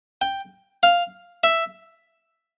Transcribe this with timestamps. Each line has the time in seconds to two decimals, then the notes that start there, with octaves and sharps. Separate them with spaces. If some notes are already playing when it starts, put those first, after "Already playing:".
0.21 G5
0.83 F5
1.44 E5